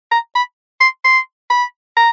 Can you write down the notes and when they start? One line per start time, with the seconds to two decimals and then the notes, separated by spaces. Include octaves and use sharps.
0.11 A#5
0.35 B5
0.81 C6
1.04 C6
1.50 B5
1.96 A#5